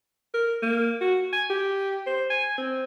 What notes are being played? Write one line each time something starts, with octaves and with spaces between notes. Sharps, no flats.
A#4
A#3
F#4
G#5
G4
C5
G#5
C4